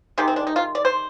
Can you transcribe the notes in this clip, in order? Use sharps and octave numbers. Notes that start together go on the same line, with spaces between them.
C3 D#3 G#3 G4
C4
D4
D#4
F4
D5
C5